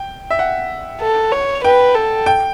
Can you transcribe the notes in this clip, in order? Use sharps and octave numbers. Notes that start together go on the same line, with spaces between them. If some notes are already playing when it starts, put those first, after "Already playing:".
Already playing: G5
E5
F#5
A4
C#5
B4 G5
A4
G5